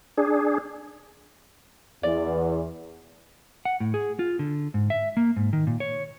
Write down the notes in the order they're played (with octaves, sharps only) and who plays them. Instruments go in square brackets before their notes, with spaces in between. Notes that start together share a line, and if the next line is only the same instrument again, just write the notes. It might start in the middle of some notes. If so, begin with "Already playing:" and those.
[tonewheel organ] D4 G#4
[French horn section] E2 [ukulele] D5
[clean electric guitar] F#5
A2
G#4
F4
D3
G#2
E5
A#3
G#2
D#3
A#2
C#5